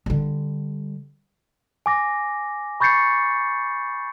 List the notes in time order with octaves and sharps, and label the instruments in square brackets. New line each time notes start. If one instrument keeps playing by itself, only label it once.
[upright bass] D3 G3
[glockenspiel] G#5 D6 A#6
B5 C#6 G6 A6 C7 C#7